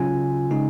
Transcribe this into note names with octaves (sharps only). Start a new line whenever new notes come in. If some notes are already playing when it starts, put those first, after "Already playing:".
Already playing: C#3 F#3 C#4 F4 G#5
C#3 G#3 D#4